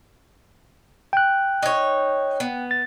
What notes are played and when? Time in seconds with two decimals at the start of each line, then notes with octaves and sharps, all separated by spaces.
1.13 G5 F#6
1.63 D#4 C#5
2.40 B3
2.71 A6